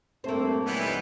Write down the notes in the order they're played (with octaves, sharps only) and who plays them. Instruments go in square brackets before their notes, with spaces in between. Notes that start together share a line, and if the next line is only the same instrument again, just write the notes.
[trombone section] G2 A3 C4 [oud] A#3 C5
[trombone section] B1 [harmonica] E3 G3 B3